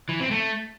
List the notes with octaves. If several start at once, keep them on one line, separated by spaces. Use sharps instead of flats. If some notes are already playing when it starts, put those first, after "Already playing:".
E3
C4
A3